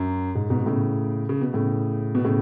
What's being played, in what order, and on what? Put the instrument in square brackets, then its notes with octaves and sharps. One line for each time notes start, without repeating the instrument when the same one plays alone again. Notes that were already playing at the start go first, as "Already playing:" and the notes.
Already playing: [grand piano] F#2
G#2
G#2 B2
B2
A2 C#3
C#3
B2
A2 C#3
B2
A2 C#3